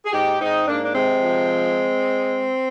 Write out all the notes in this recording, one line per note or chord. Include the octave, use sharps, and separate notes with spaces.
G#4
G#2 D#4 G4
G#2 C4 D#4
G#2 A#3 D4
D4
C3 G#3 C4
F3